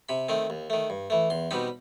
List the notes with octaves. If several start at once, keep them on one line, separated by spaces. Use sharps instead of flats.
C3 B5
D#3 A3 C4
D#2
D#3 A3
G2
E3 A3
E2 C6
B2 G3 C4 D#4 B5